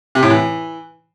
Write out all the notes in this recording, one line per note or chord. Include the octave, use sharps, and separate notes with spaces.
C3
A2
E3